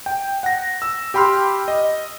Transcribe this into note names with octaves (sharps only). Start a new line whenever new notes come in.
G5
F#5 A#6
E6
G4 G5 B5 C6 F6
D#5